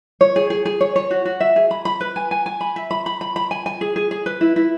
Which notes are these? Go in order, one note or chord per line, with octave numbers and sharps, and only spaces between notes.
C#5
G#4
G#4
G#4
C#5
C#5
F#4
F#4
E5
G#4
B5
B5
B4
G#5
G#5
G#5
B5
E5
B5
B5
B5
B5
G#5
G#5
G#4
G#4
G#4
B4
E4
E4